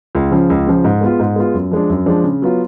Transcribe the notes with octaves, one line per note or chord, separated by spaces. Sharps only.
C#2
C#3 F3
C#2
C#3 F3
G#2
G#3 B3 F4
G#2
G#3 B3 F4
F#2
F3 G#3 D4
F#2
F3 G#3 D4
C#3
F#3 B3 F4